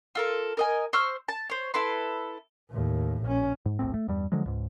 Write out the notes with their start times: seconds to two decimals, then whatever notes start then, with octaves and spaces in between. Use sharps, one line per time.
0.15 F4 A4 A#4
0.57 A#4 D#5 G#5
0.93 C5 C#6 E6 F6
1.28 A5
1.50 C5 C#5
1.74 E4 A4 B4 C6
2.70 D#2 A2
3.24 A#1 C#4
3.66 G#2
3.79 D#1 A#1 A2 C4
3.94 A3
4.08 E2 G2 G3
4.32 D3 F3 F#3 G#3
4.46 C#2 G#2